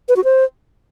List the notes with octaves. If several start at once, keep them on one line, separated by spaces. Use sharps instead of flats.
B4
F#4
C5